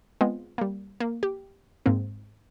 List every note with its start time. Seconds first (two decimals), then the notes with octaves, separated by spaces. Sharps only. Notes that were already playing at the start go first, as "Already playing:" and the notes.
0.21 G#3 B3 C4 F4
0.58 G3 A#3
1.00 A#3
1.23 G4
1.86 G#2 A#3 C4